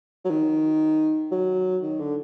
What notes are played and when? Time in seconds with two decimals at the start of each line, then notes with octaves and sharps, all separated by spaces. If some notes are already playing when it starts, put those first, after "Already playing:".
0.25 F#3
0.30 D#3
1.31 F#3
1.82 D#3
2.00 D3